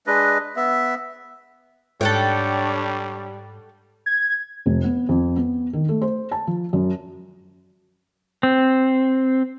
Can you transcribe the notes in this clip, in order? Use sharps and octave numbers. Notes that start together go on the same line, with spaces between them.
G#3 D4 B4 D#5
B3 E5
G#2 G3 D4 A4 C#5 F#5 G5
G#6
F1
B3
F2
B3
D#3
A3
C5
A5
F3
F#2
C4